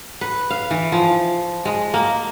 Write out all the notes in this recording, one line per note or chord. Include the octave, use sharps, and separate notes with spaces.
B4
F5
E3
F3
G#3
A#3